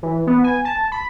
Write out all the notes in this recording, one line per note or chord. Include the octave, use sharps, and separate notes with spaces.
E3
B3
G#5
A5
B5